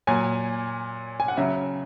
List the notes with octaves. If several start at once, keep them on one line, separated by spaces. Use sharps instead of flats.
A#2 F#3 G#5
G#5
F#5
C#3 F#3 E5